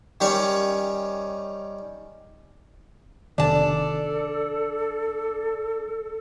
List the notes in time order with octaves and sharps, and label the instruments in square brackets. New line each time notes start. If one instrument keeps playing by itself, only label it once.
[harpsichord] D#3 G3 C#4 C#5
[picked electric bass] F1 C3 D#3 [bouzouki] D4 A5 [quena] A4 [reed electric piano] D5